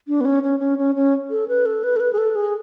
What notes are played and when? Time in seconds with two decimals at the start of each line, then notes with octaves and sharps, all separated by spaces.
0.08 D4
0.21 B3
0.25 C#4
0.43 C#4
0.60 C#4
0.78 C#4
0.95 C#4
1.30 A4
1.48 B4
1.66 A4
1.83 B4
1.96 A4
2.00 B4
2.13 G#4
2.18 A4
2.35 G#4